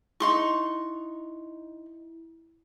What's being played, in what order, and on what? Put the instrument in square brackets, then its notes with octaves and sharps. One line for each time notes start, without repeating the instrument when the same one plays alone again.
[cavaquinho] D#4 C6 C#6 [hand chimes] E4